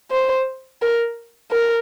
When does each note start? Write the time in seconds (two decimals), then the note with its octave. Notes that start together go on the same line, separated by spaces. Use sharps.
0.11 C5
0.82 A#4
1.51 A#4